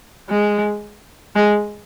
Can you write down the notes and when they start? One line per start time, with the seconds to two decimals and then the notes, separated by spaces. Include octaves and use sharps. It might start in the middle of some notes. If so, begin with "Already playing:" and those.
0.29 G#3
1.35 G#3